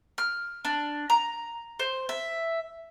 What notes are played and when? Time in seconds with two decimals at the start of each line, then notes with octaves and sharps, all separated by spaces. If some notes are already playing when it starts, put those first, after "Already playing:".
0.18 F6
0.65 D4
1.10 A#5
1.79 C5
2.09 E5